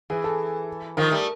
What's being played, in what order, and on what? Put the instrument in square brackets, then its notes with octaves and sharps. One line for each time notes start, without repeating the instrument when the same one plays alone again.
[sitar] E3 [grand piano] G#4
[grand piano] A4
[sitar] D#3 F3 [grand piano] A#4
[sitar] G3 A3